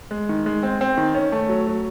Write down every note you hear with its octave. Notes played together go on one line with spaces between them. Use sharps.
G#3
D#3
G#3
C4
C4
D#3
C#4
A3
F#3
F#3